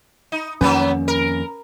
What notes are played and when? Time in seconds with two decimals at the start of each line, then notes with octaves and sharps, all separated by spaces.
0.32 D#4
0.61 F2 D#3 F#3 A#3 B3 C#4 B4
1.08 A#4